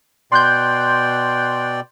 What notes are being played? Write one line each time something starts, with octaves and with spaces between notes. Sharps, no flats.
B2 D5 G5 C6 F#6 G6